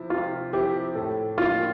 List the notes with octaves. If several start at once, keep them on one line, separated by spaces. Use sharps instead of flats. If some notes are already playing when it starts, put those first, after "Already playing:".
Already playing: C3 F3 C4 E4
C3 F4
F3 C4 E4 G4
A2 A4
F3 A#3 D4 F4